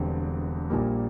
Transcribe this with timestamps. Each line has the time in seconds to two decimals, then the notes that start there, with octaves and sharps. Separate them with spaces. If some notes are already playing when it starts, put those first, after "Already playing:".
Already playing: E1 E2 D3 G3 C4
0.70 A#1 A#2 G3 A#3